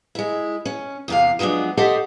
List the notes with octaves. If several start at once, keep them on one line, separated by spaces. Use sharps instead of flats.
G#3 E4
C#4
E2 C3 F5
F3 F#3 G#3 B3 D4
G4 A4 C5 D#5 E5 F#5